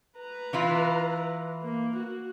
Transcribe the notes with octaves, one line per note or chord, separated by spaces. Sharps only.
B4 A#5
E3 E4 F4
A#3
F#4